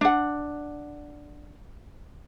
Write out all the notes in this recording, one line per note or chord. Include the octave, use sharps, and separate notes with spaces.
D4 F#5